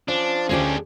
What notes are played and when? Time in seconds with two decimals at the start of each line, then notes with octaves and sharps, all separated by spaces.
0.08 F3 C#4 D4
0.49 D2 G#3 C#4 D4 G4